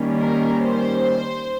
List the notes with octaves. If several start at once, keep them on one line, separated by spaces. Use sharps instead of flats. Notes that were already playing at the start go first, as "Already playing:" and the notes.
Already playing: D#3 G3 A#3 C#4
A#4
C5